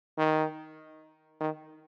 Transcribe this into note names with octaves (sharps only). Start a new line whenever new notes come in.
D#3
D#3